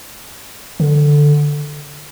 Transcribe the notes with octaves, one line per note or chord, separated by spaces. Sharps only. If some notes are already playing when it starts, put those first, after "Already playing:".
D3